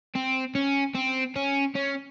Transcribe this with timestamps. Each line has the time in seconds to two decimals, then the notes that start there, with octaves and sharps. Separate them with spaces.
0.15 C4
0.55 C#4
0.95 C4
1.36 C#4
1.76 C#4